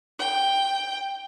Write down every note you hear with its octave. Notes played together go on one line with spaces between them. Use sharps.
G5